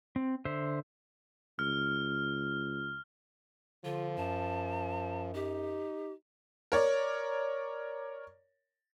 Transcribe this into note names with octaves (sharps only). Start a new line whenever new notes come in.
C4
D3 C5 E5
C#2 F6
D3 F3 F4
F#2 A5
D#4 G4
A#4 C#5 D5